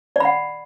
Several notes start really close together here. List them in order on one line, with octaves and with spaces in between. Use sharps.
D5 B5 F#5